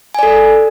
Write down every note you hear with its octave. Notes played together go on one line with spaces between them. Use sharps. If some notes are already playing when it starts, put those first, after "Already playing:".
A4 D5 G#5